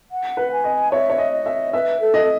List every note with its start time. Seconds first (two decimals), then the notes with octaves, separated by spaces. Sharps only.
0.11 F#5
0.37 B4
0.52 G#5
0.64 D#5
0.92 C#5 E5
1.10 C#5
1.18 D#5
1.32 D#5
1.46 E5
1.73 B4 E5
2.00 A4
2.14 D#5